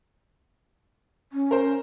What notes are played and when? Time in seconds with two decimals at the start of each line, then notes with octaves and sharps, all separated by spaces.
1.32 C#4
1.51 A#4 C5